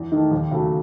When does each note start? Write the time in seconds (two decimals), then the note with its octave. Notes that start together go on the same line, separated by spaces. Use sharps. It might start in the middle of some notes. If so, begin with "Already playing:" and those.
Already playing: E2
0.12 D#3 A3
0.31 D#2
0.51 C#3 F#3 A3